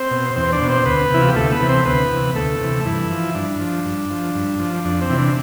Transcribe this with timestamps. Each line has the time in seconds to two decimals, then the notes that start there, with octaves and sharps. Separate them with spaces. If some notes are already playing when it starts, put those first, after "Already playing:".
Already playing: C4 C5
0.11 B2
0.36 E2 C4 C5
0.53 D4 D5
0.61 B2
0.69 C4 C5
0.86 D2 B3 B4
1.11 C3 E3 E4
1.21 F4
1.28 G4
1.36 D2 A3 A4
1.52 B3 B4
1.60 C3 E3
1.69 C4 C5
1.85 D2 B3 B4
2.11 C3 E3
2.35 D2 A3 A4
2.61 C3 E3
2.85 G2 E3 E4
3.10 F3
3.35 G2 D4
3.60 F3
3.85 G2
4.11 F3
4.35 G2
4.59 F3
4.85 F2 D4
5.01 C4
5.10 C3 E3
5.18 D4